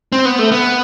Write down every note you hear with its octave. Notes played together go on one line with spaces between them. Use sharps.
C4
B3
A3
B3